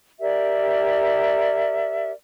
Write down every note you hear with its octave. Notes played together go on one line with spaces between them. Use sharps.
G4 A#4 D5 E5